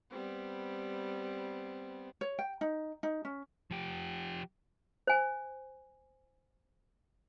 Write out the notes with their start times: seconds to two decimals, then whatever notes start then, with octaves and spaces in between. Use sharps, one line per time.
0.11 G3 B3 C4
2.21 C#5
2.39 G5
2.61 D#4
3.03 D#4
3.25 C#4
3.71 F3 G4
5.07 C5 G#5